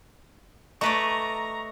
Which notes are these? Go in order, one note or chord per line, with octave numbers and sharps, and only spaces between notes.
A3 B4 D5 D#5 A#5 C#6